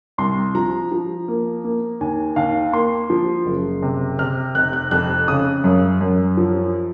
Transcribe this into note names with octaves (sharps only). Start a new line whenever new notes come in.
C2 C6
F3 A#5
F3
A#3
A#3
D#2 G#5
D#2 F5
A#3 C6
F3
F#1
C3
C3 F6
F1 F#6
F#6
F2 F#6
C#3 D#6
F#2
F#2
F3